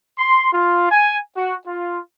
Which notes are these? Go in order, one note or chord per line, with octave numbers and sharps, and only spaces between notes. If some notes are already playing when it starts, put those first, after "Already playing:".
C6
F4
G#5
F#4
F4